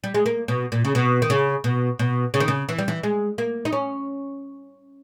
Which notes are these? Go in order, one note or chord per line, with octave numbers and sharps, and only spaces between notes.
G3
G#3
A#3
B2
A#2
C#3
B2
D#3
C#3
B2
B2
C#3
D#3
C#3
E3
G3
E3
G#3
A#3
D#4
C#4